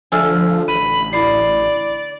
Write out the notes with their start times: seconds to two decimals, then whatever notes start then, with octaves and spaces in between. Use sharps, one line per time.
0.12 D3 F3 A3 G#4 G#5 E6 F6
0.68 A1 B5 D#7
1.13 E4 D5 B5 C7